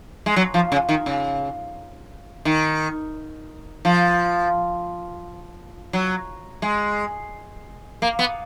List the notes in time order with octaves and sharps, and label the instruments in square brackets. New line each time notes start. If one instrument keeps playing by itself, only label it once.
[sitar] G#3
F#3
F3
C#3
D#3
C#3
D#3
F3
F#3
G#3
A#3
B3